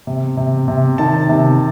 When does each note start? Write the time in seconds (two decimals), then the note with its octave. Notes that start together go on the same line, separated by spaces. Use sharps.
0.07 C3
0.37 C3
0.68 C3
0.98 D#3 A5
1.29 C3